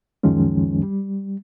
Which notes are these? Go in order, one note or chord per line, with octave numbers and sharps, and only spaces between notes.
C#2 F#2 D#3 F3 G#3 C#4
G3